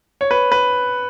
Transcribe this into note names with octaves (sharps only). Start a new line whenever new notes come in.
C#5
B4
B4